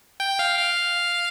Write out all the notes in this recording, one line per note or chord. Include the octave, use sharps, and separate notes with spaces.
G5
F5
F5